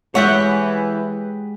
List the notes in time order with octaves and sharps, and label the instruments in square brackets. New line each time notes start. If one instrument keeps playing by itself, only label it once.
[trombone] E3 [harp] G#3 [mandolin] G4 B4 F#5 [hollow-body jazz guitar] C#5 E5